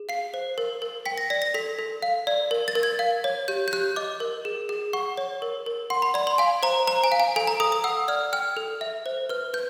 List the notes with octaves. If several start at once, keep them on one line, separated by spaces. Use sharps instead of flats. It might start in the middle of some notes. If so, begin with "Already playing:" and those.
Already playing: G#4
F5 C7
C5
A#4
A#4
G5 B6
A#6
D5 A#6
A#6
A4 B6
A4
F5
D5
A#4
A6
A#4
G#6
F5
C#5
G4 G6
G6
G4 F#6
D#5 D6
A#4
G#4
G#4
F#5 C#6
C#5
A#4
A#4
F#5 C6
B5
D5 B5
C6
F5 G#5
C5 A#5
C5 A#5
G#5
F5
G#5
A4 G#5
A#5
A4 D#6
D#6
F#5 E6
D5 F6
G5 F6
A4
E5
C5
B4 F6
B4 G6